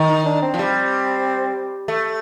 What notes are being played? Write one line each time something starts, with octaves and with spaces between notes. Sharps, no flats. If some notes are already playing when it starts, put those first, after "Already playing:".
Already playing: D#3
D#4
D4
C4
F3
G3
A3